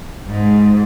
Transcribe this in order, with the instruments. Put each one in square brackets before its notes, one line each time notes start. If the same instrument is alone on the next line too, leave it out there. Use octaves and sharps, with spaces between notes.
[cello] G#2